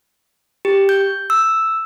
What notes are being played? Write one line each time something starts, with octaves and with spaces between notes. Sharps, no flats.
G4
G6
E6